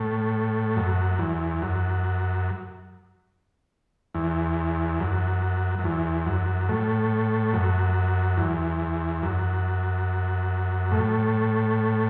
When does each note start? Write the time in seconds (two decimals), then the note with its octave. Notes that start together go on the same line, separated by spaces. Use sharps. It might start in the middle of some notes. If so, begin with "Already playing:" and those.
Already playing: A2
0.76 F#2
1.19 E2
1.62 F#2
4.14 E2
5.00 F#2
5.79 F#2
5.84 E2
6.26 F#2
6.69 A2
7.53 F#2
8.37 E2
9.22 F#2
10.91 A2